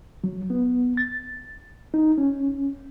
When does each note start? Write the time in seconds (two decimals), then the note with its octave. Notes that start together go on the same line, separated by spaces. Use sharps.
0.24 F#3
0.50 B3
0.97 A6
1.94 D#4
2.18 C#4